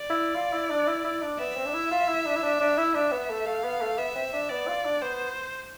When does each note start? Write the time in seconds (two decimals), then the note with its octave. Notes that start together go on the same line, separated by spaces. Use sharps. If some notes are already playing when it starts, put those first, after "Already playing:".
Already playing: D5
0.10 E4
0.36 F4
0.53 E4
0.70 D4
0.87 E4
1.04 E4
1.22 D4
1.39 B3 E5
1.57 C4
1.66 D4
1.74 E4
1.91 F4
2.08 E4
2.26 D4
2.36 E4
2.43 D4
2.60 D4
2.78 E4
2.94 D4 E5
3.12 B3
3.30 A3
3.46 A3 F5
3.64 B3
3.81 A3
3.98 B3 E5
4.15 C4
4.33 D4
4.50 B3 D5
4.68 F4
4.85 D4
5.02 B3 C5